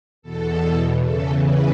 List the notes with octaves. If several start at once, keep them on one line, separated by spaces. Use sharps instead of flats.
E2 B2 A4
E2 C#3 E3 A4
B4